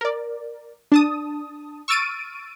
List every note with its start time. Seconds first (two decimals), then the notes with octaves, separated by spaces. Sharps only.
0.01 A#4 D5
0.92 D4 A5 D#6
1.88 C#6 E6 F6 A6 D7 D#7